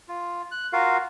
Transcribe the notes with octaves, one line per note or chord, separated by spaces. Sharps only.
F4
F#6
F4 F#4 A#4 F5